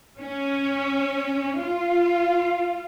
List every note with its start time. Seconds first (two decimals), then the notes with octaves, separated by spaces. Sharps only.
0.20 C#4
1.59 F4